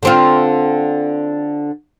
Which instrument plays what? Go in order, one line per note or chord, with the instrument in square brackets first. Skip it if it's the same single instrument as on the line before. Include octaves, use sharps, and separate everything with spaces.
[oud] D3 C4 F4